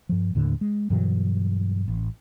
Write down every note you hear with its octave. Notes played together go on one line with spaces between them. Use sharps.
G2 F3
D#2 A2 D3
G#3
G2 B2 E3 F#3
A1